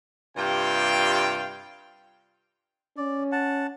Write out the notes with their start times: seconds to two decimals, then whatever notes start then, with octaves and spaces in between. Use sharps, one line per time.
0.37 G2 C3 F4 F5 G5
2.97 C#4 D5
3.32 F#5 A5